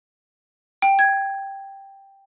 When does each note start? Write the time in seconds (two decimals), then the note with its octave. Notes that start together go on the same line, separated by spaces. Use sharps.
0.82 G5
0.99 G#6